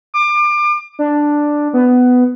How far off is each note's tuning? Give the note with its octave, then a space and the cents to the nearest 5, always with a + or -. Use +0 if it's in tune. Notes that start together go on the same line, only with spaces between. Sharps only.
D6 +30
D4 +5
B3 +15